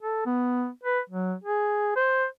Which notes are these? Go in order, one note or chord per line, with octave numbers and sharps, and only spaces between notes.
A4
B3
B4
F#3
G#4
C5